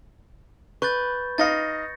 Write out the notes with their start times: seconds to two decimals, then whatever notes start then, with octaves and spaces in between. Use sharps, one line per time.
0.82 B4 C#6 G6 A6
1.38 D#4 D#5 F5 A6 A#6 C#7